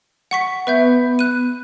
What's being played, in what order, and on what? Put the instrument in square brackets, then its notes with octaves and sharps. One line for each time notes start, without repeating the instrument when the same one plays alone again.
[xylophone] F#5 C#6 B6
[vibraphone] B3 [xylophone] B4 E5 G6
[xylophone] F#6 D#7